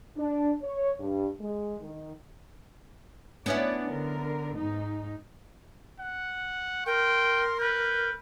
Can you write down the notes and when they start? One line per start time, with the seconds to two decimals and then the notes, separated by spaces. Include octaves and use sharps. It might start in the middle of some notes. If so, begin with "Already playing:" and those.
0.17 D4
0.62 C#5
1.00 G2
1.40 G#3
1.81 D#3
3.46 B3 C#4 D4 E4 D5
3.92 D3 A#4
4.55 G#2 D#4
5.99 F#5
6.86 A#4 G5 C6
7.60 B4 G6